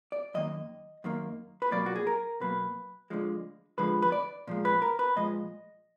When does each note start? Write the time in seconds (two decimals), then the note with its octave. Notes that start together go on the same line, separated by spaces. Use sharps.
0.12 D5
0.34 F#2 D#3 A#3 D#5
1.04 F#2 D#3 A#3
1.62 B4
1.72 B2 F#3 A#3 D5
1.86 F#4
1.96 G#4
2.07 A#4
2.40 B2 F#3 A#3 B4
3.10 D2 D3 F3 G#3
3.78 D2 D3 F3 G#3 B4
4.02 B4
4.12 D5
4.47 A#2 F3 G#3
4.65 B4
4.82 A#4
4.99 B4
5.16 A#2 F3 G#3 D#5